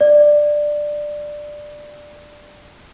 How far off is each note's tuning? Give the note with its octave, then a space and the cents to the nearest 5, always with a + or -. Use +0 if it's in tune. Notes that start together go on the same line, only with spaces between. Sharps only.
D5 +10